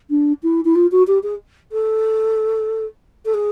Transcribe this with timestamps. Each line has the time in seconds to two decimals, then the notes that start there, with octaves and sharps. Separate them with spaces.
0.10 D4
0.43 E4
0.65 E4
0.75 F4
0.91 F#4
1.07 G4
1.23 G#4
1.72 A4
3.25 A4
3.34 G#4